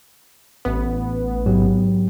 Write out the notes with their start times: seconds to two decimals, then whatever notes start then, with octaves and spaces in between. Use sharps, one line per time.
0.65 A1 B3
1.46 G#2 F#3 G4